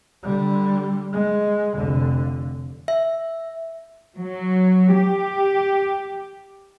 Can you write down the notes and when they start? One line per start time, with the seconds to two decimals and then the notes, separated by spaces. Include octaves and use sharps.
0.23 D3 G3
1.13 G#3
1.77 F1 D3
2.88 E5
4.18 F#3
4.96 G4